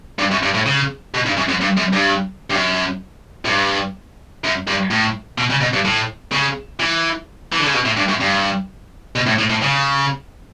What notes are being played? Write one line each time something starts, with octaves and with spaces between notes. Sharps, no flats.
G2
F#2
G2
A2
C#3
B2
G2
F#2
F#2
G2
F#2
G2
G2
F#2
A2
G2
F#2
G2
A2
B2
C#3
B2
G2
A2
C#3
E3
E3
D3
C#3
B2
A2
G2
F#2
G2
B2
A2
A2
A2
C#3